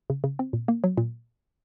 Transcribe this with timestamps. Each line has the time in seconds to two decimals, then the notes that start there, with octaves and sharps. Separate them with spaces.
0.10 C#3
0.24 C#3
0.39 C4
0.53 A#2
0.68 A#3
0.84 F#3
0.97 A#2